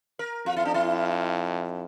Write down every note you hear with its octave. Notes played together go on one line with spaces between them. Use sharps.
A#4
F2 F4
E4
D4
E4